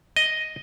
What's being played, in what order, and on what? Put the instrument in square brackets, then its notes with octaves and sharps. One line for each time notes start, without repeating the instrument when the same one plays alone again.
[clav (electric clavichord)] D#5